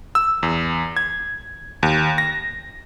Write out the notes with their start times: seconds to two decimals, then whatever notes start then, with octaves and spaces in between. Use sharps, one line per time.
0.15 E6
0.43 E2
0.96 G#6
1.83 D#2
2.18 A#6